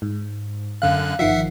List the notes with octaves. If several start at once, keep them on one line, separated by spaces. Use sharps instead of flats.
G#2
F#2 D3 F5 F#6
G1 D#3 F3 E5 F#5 C7